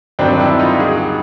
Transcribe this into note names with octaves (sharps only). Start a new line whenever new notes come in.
G2 D#3 F#3 C4 D4
D4 E4
D#4 F4
F#4 G#4